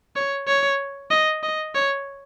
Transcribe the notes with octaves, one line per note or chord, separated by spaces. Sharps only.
C#5
C#5
D#5
D#5
C#5